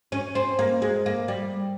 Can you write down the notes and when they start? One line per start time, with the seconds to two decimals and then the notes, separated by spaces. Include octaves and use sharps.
0.12 C#4
0.35 C4
0.59 A#3
0.82 G#3
1.06 A#3
1.28 G3